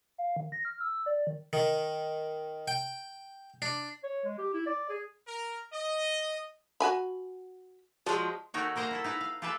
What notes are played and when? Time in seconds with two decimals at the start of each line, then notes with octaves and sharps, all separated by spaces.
0.18 F5
0.36 D#3
0.52 A#6
0.65 F6
0.81 E6
1.06 D5
1.27 D#3
1.53 D#3
2.68 G5
3.62 D4
4.03 C#5
4.25 G#3
4.38 G4
4.53 E4
4.66 D5
4.89 G#4
5.27 A#4
5.72 D#5
6.80 F#4 G#5 B5
8.06 F3 F#3 G#3 D5
8.54 D#3 A3 D#4 F#4 C#5 G5
8.76 A#3 A#4 C5 D#5 F#5 A#5
8.91 E4 A4 E5
9.04 D#4 E4 B4
9.21 F5
9.42 F4 G4 A4 B4 E5